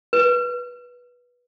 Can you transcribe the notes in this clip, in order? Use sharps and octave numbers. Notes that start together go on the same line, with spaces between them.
B4